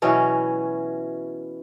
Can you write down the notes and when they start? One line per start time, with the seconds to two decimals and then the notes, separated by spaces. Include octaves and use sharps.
0.02 B2 E3 F#3 C#4